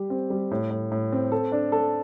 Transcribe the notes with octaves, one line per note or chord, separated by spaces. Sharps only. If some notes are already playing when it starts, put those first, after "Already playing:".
Already playing: G3 G4
C4
G3
A2
A2
A2
C4
A4
D4
A4